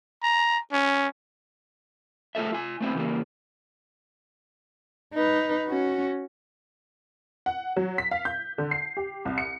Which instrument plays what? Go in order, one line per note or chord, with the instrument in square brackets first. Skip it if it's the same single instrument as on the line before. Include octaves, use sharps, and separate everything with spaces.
[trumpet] A#5
C#4
[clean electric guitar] A3 F4 G#4 A4 E5
F4 G#5
A3 B3 C4 E4 F#4
C#3 E3 G3 A#3
[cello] D#4 B4
C#4 F#4
[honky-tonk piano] F#5
F#3
B6
F5
G6
D3
C7
G4
C2
C#7